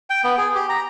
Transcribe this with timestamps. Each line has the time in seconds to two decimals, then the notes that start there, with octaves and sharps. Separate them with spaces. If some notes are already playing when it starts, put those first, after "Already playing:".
0.10 G5
0.24 B3
0.38 G#4
0.55 G4
0.69 A#5